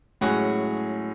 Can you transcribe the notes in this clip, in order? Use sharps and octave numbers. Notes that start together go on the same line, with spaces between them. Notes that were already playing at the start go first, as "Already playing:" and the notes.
A2 F#3 G#3 C#4 F#4 G#4